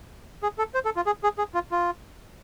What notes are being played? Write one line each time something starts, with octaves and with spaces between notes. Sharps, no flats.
G#4
A4
C5
A4
F4
G#4
G#4
G#4
F4
F4